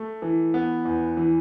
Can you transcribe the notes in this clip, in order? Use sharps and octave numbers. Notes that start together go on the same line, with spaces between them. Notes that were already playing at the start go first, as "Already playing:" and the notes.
Already playing: A3
E3
B3
E2
E3